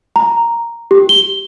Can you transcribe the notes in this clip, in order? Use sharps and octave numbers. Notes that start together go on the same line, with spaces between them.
A#5
G4
G7